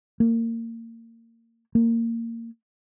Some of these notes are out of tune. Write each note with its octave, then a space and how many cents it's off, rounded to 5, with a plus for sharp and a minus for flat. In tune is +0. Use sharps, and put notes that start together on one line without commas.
A#3 -25
A#3 -20